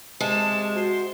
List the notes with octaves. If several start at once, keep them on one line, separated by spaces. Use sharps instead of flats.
C3 G#3 A5
F#4 C5